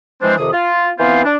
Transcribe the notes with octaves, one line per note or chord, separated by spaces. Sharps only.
E3 F3 G#3 C4 D4 C5
F2 C3 D#3 D#6
F4
E3 B3 C4 F4 C5 F5
D4